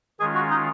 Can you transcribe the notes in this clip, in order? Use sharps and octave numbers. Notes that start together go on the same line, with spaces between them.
D#3 G#3 C#4 F4 G#4
F#4
D#4